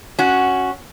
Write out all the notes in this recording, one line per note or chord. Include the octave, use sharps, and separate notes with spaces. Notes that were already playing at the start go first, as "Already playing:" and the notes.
C#4 F#4